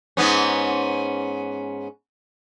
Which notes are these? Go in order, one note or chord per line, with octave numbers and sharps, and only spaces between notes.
G#2 B3 C#4